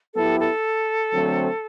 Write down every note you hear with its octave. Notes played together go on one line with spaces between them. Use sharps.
F#3 B3 E4 G4 A4
A4
D3 F#3 A3 C4